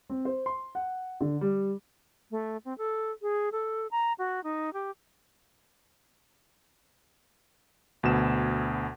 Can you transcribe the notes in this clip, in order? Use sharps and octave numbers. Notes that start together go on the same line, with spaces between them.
C4
C5
C6
F#5
D3
G3
A3
C4
A4
G#4
A4
A#5
F#4
D#4
G4
D2 B2 E7